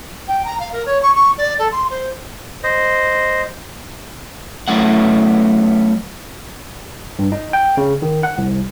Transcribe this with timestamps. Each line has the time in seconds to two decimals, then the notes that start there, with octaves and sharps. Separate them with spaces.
0.28 G5
0.45 A#5
0.60 F5
0.72 A#4
0.86 C#5
1.02 C#6
1.15 C#6
1.38 D5
1.59 A4
1.72 C6
1.90 C5
2.64 C5 D#5
4.68 F#3 A3 B3 C#4 E4 F#5
7.19 G2
7.32 D#4
7.53 G5
7.77 C#3
8.02 D#3
8.23 F#5
8.38 C2